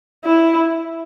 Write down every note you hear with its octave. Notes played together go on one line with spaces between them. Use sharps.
E4